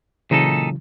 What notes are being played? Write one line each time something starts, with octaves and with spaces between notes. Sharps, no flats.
A#2 C#3 E3 F#3 D#4 A4